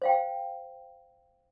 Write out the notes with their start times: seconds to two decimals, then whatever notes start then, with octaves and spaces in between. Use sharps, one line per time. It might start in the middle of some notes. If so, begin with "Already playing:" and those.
0.02 C5 F5 G5